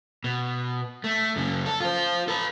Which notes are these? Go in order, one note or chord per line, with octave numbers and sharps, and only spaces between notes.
B2
A3
F#2 C#3
A4
F4 C5
A4 B4